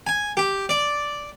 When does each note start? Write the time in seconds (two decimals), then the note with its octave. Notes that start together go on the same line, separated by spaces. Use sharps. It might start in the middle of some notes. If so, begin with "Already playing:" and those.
0.07 G#5
0.37 G4
0.69 D5